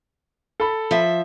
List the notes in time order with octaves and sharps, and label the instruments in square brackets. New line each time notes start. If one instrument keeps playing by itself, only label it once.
[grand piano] A4 B5
[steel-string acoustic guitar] F3 E5